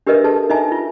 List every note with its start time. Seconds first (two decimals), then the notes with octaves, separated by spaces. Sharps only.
0.07 D4 G4 A#4 B4 D#5 E5
0.24 G#4 A4 B4 A5
0.50 D#4 D#5 E5 G#5 A#5
0.72 F4